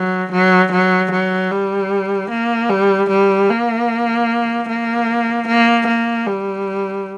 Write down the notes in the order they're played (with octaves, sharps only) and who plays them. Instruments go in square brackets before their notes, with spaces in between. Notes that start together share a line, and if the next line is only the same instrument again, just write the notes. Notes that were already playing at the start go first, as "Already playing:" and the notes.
Already playing: [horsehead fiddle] F#3
F#3
F#3
F#3
G3
A#3
G3
G3
A#3
A#3
A#3
A#3
G3